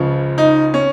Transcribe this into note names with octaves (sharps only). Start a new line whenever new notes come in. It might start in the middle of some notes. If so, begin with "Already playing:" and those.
Already playing: C#2 C#3 F3
D#4
C#4